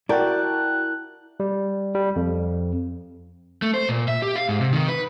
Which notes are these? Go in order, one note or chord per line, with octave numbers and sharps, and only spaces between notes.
E4 F#4 A#4 D5 G5 A5 F#6
G3
G3
F2
A3
C5
A#2
E5
G4
F5
G#2
C3
D#3
B4